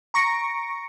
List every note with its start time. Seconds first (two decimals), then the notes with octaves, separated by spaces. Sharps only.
0.14 A#5 C#6 A#6 C#7 D7